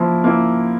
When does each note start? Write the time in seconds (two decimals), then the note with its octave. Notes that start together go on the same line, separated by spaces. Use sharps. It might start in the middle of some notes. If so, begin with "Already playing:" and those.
Already playing: F3 A#3 E4
0.24 A#3 E4